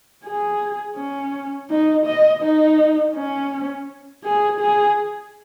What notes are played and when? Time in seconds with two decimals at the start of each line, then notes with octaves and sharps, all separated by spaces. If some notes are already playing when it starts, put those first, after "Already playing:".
0.25 G#4
0.96 C#4
1.70 D#4
2.06 D#5
2.43 D#4
3.15 C#4
4.24 G#4
4.60 G#4